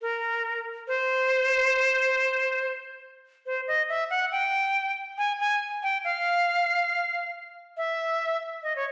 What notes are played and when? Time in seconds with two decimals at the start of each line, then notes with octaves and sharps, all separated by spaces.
0.02 A#4
0.87 C5
3.46 C5
3.68 D#5
3.89 E5
4.10 F#5
4.32 G5
5.18 G#5
5.40 G#5
5.83 G5
6.05 F5
7.77 E5
8.63 D#5
8.76 C#5